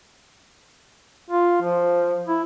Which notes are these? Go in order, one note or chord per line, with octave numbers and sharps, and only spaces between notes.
F4
F3
E4